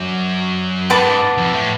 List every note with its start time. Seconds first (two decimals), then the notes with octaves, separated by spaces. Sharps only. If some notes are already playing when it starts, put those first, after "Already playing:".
Already playing: F#2 D5
0.90 G#2 B4 F#5 A5 D6
1.38 F2
1.53 A2